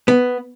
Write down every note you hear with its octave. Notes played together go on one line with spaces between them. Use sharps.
B3